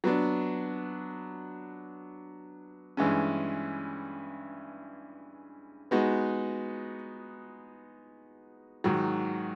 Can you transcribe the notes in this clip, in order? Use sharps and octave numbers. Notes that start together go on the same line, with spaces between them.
F#3 B3 D4
G2 E3 G#3 C#4
G#3 B3 D#4 F#4
G#2 D#3 F#3